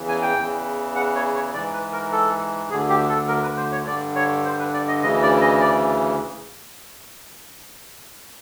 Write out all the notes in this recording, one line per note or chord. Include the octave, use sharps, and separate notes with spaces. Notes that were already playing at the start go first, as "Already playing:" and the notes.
Already playing: E2 C#3 E3
G#5
G5
E2 C#3 E3
F#5
C#5
C#5
G#2 E3 D5
B4
A#4
A4
D2 D3 G#4
G4
A4
A#4
B4
C5
C#5
G2 D3 D5
C#5
C5
B4
D5
D#5
D2 C#3 E3 D#5
D5
D#5
D5